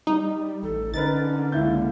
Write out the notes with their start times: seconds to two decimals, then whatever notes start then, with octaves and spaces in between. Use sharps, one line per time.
0.07 G3 D#4
0.63 A1 A4
0.94 D3 C#4 D#4 A#4 B4 A6
1.52 C#2 A#3 E4 G6